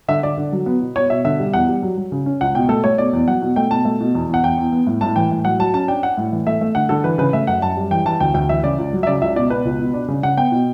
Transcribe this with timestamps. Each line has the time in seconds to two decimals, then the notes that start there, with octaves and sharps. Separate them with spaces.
0.08 D3 E5
0.23 D3 D5
0.38 D3
0.52 F#3
0.66 B3
0.81 B2
0.96 B2 C#5
1.10 B2 E5
1.24 D3 E5
1.39 G3
1.54 E2 F#5
1.69 G3
1.83 F#3
1.97 F#3
2.12 C#3
2.26 C#4
2.41 C#2 F#5
2.55 B2 G5
2.69 A3 A4
2.84 A3 C#5
2.98 B2 D5
3.13 E2
3.28 F#3 F#5
3.42 B2
3.56 A3 G5
3.71 B2 A5
3.85 A3
4.00 B2
4.15 E2
4.29 E2 F#5
4.43 E2 G5
4.58 E2
4.72 B3
4.87 A2
5.01 A2 A5
5.16 E3 G5
5.31 A2
5.45 F#3 F#5
5.59 F#3 A5
5.74 C#4 A5
5.88 D4 G5
6.03 D4 F#5
6.17 A2
6.32 E3
6.47 A3 E5
6.61 A3
6.75 D3 F#5
6.89 D3 A4
7.04 E3 B4
7.18 C#3 B4
7.33 A3 E5
7.47 F#2 F#5
7.62 F#2 A5
7.77 G3
7.91 E3 G5
8.06 E3 A5
8.20 D2 G5
8.34 D2 G5
8.49 E3 E5
8.63 C#3 D5
8.78 C#2
8.93 F#3
9.03 E5
9.07 C#3 D5
9.21 C#2 E5
9.36 B2 D5
9.50 B2 B4
9.65 C#2
9.79 B2
9.94 D4
10.08 C#3
10.23 C#3 F#5
10.37 B3 G5
10.52 B2